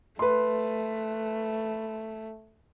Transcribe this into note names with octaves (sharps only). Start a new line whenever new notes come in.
A3 B4 C6